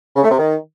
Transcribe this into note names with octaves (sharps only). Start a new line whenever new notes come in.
C#3
A3
C3
D#3